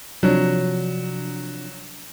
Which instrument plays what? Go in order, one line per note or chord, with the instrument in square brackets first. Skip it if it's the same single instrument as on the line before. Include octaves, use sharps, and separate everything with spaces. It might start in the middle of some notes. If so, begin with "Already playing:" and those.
[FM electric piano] C3 F3 D4 [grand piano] F#3